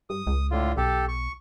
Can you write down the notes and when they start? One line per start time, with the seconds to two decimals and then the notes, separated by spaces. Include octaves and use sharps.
0.10 G2 D#6
0.27 C#2
0.51 A2 D3 F4
0.77 B1 G4 A4
1.08 C#6